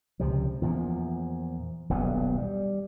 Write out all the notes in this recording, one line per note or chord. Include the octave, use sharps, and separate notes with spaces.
C#2 C3 F3
E2 A#2 F3
D#1 B1 G2 B3
G3